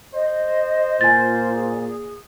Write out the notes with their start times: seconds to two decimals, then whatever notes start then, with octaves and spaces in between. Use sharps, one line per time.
0.14 C5 D#5
1.01 A#2 F4 G#5 A6
1.54 G#4